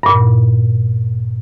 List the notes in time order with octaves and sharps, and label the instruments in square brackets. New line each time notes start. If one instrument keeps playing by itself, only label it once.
[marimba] G2 A#2